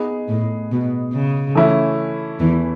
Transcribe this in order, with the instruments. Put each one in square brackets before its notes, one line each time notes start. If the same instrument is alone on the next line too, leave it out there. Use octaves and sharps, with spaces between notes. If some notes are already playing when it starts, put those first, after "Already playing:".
Already playing: [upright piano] B3 D#4 G#4
[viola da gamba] A2
B2
C#3
[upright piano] E3 A3 C#4 E4
[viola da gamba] E2 E3